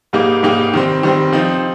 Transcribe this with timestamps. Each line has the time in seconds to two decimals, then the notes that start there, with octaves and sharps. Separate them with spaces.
0.13 G#2 G3 A#3 D#4 G4
0.43 G#2 G3 A#3 D#4 G4
0.74 D#3 G3 C4
1.03 D#3 G3 C4
1.33 F3 C4 D#4